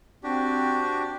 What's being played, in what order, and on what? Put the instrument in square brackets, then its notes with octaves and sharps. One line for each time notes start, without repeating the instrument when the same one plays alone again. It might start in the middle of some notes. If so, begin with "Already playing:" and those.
[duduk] C4 [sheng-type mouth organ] D4 F#4 G4